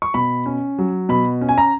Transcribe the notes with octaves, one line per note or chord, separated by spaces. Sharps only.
C#6
B2 B5
C#4
F#3
B2 B5
C#4
G#5
A#5